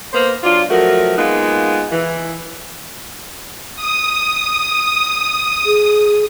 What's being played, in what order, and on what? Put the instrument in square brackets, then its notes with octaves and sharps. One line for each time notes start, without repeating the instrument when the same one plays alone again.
[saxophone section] A#3 B3 C5
F#3 D4 F4
F3 F#3 A3 F#4 A#4
G#3 A#3 B3 D#4 F4
E3
[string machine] D#6
[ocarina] G#4